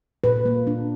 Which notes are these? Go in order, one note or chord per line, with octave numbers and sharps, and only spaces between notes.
A#2 B4
A#3
D4